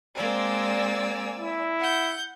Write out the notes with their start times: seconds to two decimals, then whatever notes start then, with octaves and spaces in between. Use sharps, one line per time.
0.17 G#3 A#3 C4 D5 G#5 E6
1.39 E4
1.81 F#5 G6